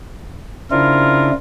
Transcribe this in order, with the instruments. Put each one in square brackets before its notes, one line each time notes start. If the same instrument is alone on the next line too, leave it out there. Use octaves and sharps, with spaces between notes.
[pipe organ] C#3 D4 E4 [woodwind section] C4 F4 A#4